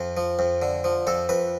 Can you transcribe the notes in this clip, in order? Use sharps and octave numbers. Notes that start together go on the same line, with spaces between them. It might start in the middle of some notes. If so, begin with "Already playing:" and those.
Already playing: F2 F4
F3
F2
D3
F3
F2 A4
F2 B4